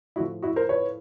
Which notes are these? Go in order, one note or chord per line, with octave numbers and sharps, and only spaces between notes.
A2 F3 E4 F#4
E4 F#4
A#4 C5
B4 C#5